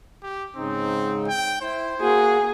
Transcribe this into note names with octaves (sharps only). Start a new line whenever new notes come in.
G4
G#2 C#3 C4 D#4
G5
E4 C5
A#3 F#4 G#4